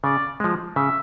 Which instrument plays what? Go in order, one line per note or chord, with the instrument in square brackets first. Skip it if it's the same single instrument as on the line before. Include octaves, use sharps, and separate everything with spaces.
[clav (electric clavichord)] C#3 [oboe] D5
[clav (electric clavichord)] F3 G#3
[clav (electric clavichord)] C#3 [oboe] E5